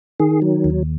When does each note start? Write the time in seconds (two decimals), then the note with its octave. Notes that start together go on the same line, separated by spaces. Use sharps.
0.20 D#3 G#4
0.42 F#3
0.64 D#2